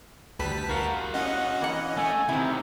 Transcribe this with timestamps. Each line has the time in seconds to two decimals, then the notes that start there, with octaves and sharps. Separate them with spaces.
0.39 D2 G3 B4 A5 B6
0.69 F#4 A#4 F5
1.14 C#4 D#5 F#5
1.61 E3 A#3 F#5
1.97 A3 G#5
2.29 C3 D#3 C4 E4